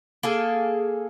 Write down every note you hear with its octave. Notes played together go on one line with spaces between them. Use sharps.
A#3 G#4 A4